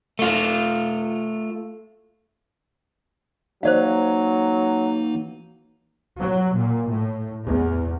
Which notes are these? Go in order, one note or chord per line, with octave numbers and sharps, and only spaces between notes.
A3 F4
E3 F#3 A#3 D#4 C5 D5 F5
F#3
A#2
A2
E2